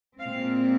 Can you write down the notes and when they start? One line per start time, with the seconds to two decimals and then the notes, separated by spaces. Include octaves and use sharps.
0.19 A#2 G#3 C4 F5